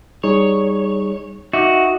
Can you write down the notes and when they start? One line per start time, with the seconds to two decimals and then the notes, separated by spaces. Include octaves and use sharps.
0.23 G3 D#4 G#4 C#5
1.53 D#4 F#4 E5 D6